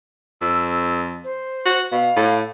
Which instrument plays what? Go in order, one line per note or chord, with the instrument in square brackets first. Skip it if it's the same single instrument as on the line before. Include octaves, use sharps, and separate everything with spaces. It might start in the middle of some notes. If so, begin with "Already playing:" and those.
[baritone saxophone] F2 [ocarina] E6
[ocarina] C5
[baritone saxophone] F#4
[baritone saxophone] B2 [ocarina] F5
[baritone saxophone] A2